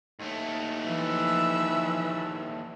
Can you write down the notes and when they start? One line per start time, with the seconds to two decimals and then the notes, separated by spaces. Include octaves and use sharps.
0.20 D#2 A3
0.85 E3 F3 B4 E5